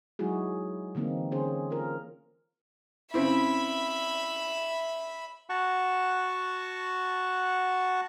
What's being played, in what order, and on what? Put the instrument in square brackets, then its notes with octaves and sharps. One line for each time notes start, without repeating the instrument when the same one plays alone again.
[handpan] F#3 G#3 D#4 E4 F#4 G#4
D3 E3 A#3 C4 D#4
D3 A#3 C#4 G#4 C5
F4 A#4
[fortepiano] C#3 C4 E4 [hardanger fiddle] E5 B5
[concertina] F#4 F#5 A5 C#6